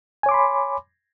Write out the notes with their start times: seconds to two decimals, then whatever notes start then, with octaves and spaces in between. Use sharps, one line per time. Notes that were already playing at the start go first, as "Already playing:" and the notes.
0.23 G#5
0.26 C#5
0.29 D6
0.31 C6
0.34 B5